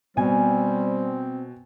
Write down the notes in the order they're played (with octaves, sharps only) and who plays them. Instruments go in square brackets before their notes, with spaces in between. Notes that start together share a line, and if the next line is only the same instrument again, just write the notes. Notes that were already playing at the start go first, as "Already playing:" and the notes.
[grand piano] B2 [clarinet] G3 [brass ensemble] C4 [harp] G#5